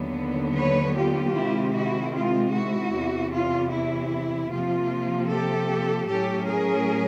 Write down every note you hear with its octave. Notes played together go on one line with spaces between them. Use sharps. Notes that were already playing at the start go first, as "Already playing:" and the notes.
Already playing: D#2 D3 F#3 B3
B4 C#5
F4 G4
C3 D#3 G#3 C4 E4
E4 F#4
F4
E4 F#4
E2 C3 E3
F4
E4
C3 F3 A#3 F4
G4 A4
A2 F#3 A3 C#4 G4 A4
G#4 A#4